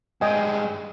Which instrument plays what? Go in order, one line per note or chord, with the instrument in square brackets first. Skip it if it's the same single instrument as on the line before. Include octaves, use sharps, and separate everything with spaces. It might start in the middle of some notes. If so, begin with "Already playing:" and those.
[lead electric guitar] G2 G#3 [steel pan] D#5 G5 G#5